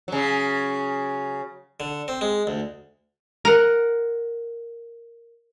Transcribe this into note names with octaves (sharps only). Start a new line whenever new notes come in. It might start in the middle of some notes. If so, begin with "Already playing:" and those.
C#3 F#3
D3
C4
G#3
D2
A#4 F#5